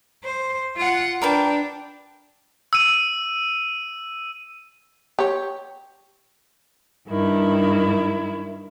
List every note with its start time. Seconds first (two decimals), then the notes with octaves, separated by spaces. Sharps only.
0.24 C5
0.77 F4 F#5
1.22 D4 A#4 B4 G5
2.73 E6 D#7
5.19 G4 C#5
7.08 G2 D#3 E4